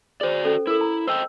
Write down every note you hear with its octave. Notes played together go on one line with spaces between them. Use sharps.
F#4 G#4 C5 D5
C#4 A4
E4 A4 A#4
A#5
C5 D#5 G5 E6